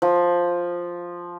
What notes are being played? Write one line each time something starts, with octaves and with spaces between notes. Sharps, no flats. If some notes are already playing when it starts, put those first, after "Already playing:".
F3